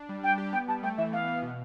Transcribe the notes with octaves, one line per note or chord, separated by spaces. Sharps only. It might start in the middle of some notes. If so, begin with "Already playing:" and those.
Already playing: D4
G3
D4 G5
G4
B3 G5
G3 A5
A3 G5
E3 E5
B3 F5
B3
B2